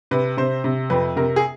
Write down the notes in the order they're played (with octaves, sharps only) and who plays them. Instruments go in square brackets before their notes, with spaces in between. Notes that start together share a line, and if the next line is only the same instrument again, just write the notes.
[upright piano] C3 B4
C3 C5
C3
F2 B4
C3 A#4
G#4